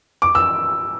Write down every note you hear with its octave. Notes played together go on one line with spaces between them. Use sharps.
D6
E6